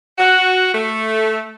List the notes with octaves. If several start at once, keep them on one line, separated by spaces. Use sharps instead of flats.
F#4
A3